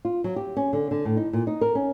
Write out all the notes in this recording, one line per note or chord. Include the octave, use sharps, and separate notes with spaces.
F4
F#3
G4
C#4
D3
D3
A2
D#4
A#2
D#4
A#4
C#4